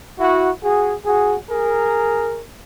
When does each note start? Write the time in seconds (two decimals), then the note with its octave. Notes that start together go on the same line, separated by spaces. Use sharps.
0.18 E4 F#4
0.61 F#4 G#4
1.04 F#4 G#4
1.49 G#4 A#4